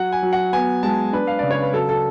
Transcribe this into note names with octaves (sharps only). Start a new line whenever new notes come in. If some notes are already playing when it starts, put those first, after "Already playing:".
Already playing: F#3 F#5
G#5
F#3
F#5
B3 G#5
G#3 A5
D4 B4
F5
C#3 D5
C#5
B4
F#3 A4
A4